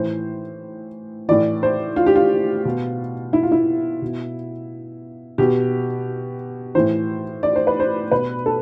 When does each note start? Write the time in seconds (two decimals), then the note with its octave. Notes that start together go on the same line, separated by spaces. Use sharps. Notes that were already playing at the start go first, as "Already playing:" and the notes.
Already playing: A2 E3 C5
1.29 A2 E3 D5
1.63 C5
1.96 F4
2.06 G4
2.16 F4
2.65 B2
3.33 E4
3.43 F4
3.52 E4
4.02 B2
5.38 B2 G4
6.75 A2 E3 C5
7.43 D5
7.56 C5
7.67 B4
7.80 C5
8.11 B2 B4
8.46 A4